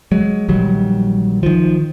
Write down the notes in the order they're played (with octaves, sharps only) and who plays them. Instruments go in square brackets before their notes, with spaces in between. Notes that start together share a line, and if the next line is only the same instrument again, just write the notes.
[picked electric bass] F#3 G#3
A#1 D#3 F#3 G3
D#3 F3